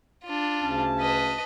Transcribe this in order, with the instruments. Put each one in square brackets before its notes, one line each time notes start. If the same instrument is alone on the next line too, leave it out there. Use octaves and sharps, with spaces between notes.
[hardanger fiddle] D4 F4
[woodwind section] D2 C#3 C#4 [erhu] A5
[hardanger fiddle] B4 D#5